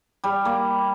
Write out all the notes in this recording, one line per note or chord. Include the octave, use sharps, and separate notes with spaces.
G3
A#3